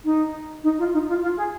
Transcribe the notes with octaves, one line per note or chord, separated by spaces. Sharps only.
D#4
D#4
F4
D#4
F4
F4
G#4